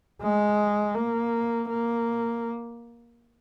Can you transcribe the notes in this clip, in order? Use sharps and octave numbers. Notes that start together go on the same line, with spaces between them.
G#3
A#3
A#3